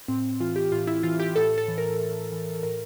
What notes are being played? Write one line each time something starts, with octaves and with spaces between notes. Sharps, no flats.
A2 C4
E3 F4
G4
A2 F4
E4
E3 F4
G4
A2 A4
A4
E3
A#4
A2
E3
A2 A#4